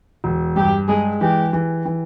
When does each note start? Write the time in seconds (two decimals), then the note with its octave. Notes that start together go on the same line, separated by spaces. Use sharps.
0.24 E1
0.56 G2 G4
0.88 G#3 G#4
1.21 E3 G4
1.53 E3
1.85 E3